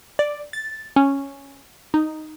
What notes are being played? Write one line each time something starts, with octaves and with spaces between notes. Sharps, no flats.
D5
A6
C#4
D#4